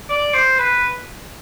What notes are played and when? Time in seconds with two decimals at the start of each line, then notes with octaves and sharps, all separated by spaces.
0.10 D5
0.34 C5
0.59 B4